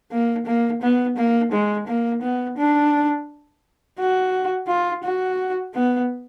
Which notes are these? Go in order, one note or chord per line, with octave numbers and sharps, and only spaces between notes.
A#3
A#3
B3
A#3
G#3
A#3
B3
D4
F#4
F4
F#4
B3